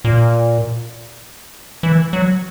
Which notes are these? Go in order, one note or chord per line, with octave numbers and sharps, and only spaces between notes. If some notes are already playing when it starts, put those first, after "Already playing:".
A#2
E3
F#3